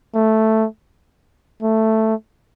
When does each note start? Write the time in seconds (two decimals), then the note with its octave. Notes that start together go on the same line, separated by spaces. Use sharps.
0.14 A3
1.62 A3